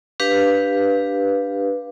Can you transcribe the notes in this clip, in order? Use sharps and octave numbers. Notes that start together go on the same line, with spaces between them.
D4 G4 B4 F5